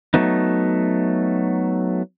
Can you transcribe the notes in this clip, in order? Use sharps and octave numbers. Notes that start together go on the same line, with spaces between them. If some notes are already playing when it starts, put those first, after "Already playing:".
F#3 A3 B3 D#4